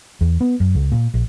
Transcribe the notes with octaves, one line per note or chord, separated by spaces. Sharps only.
E2
B3
F#2
C#2
A#2
A#1